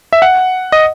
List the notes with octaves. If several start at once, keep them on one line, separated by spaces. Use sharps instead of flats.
E5
F#5
D#5